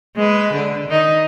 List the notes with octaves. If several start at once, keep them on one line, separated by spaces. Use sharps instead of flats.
G#3 B4
D3 D4
D#3 D#4